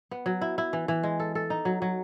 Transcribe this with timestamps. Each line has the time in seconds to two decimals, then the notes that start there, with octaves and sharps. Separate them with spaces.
0.11 B3
0.26 F#3
0.41 E4
0.58 E4
0.73 E3
0.88 E3
1.03 G#3
1.20 A4
1.35 A4
1.50 D#4
1.65 F#3
1.82 F#3